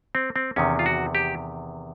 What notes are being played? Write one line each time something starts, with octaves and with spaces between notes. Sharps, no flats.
C4
C4
E2 C3 D#3 C#4
F4
F#4
G4